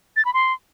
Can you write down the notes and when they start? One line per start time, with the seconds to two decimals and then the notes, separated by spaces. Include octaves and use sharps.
0.16 A6
0.25 B5
0.34 C6